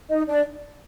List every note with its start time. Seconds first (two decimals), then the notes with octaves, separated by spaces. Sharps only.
0.10 D#4 D#5
0.27 D4 D5